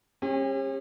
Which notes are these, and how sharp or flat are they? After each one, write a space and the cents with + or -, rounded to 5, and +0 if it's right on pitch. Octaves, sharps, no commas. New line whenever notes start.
G3 +0 C#4 -40 G4 +45